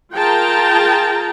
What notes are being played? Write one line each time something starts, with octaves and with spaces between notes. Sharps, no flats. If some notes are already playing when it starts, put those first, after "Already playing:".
F4 G#4 A#4 G5 A5 A#5